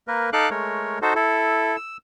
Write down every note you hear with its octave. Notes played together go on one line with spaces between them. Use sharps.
A#3 A#4 B4
D#4 A4 F5 D6 F#6
G#3 A3 A#4 C#5
D#4 F#4 A4 C5
E4 A4
E6